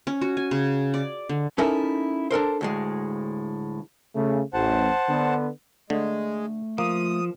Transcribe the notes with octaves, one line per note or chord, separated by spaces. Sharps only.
C#4
F#4
G#5
C#3
D5
D3
C#4 D#4 E4 A4 A#4
D4 A4 A#4 C5
D2 A2 G#3
C#3 A3
A1 C5 F#5 A5
D3 B3
D3 G#3 A3
F3 A#3 D#6